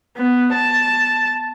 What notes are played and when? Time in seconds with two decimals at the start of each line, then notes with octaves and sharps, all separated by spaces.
0.17 B3
0.53 A5